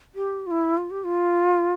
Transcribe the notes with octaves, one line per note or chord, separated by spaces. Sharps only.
G4
F4
E4
F4
G4
F4